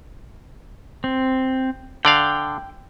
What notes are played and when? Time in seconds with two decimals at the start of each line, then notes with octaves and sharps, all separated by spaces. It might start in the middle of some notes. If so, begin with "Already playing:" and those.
1.04 C4
2.05 D3 D5 F5 G5